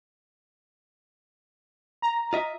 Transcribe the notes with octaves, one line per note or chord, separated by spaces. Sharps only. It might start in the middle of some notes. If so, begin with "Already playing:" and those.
A#5
F4 D#5 E5